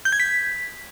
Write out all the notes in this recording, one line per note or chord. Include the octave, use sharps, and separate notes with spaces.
G6
G#6
B6